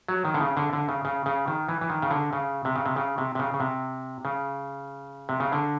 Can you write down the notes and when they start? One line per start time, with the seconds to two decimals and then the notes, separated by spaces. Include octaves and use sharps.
0.09 F#3
0.25 D#3
0.34 D3
0.41 C#3
0.57 D3
0.73 D3
0.89 C#3
1.05 C#3
1.26 C#3
1.48 D#3
1.69 E3
1.81 E3
1.90 D#3
2.02 C#3
2.11 D3
2.33 C#3
2.65 C3
2.76 C#3
2.86 C3
2.96 C#3
3.18 C3
3.35 C3
3.39 C#3
3.54 C#3
3.60 C3
4.25 C#3
5.29 C3
5.40 C#3
5.52 D3